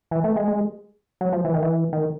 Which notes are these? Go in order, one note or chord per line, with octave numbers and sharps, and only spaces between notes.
E3
A3
G#3
G#3
F#3
F3
E3
D#3
E3
D#3